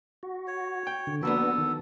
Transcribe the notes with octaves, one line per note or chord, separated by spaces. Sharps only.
F#4
C#5
G5
D3
F3 A#3 B3 D4 F#4 A4 B4
D#3